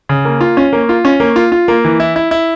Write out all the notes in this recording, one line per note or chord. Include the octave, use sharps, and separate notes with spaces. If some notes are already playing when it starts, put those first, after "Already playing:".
C#3
A#3
F4
C#4
A#3
F4
C#4
A#3
F4
F4
A#3
E3
E4
E4
E4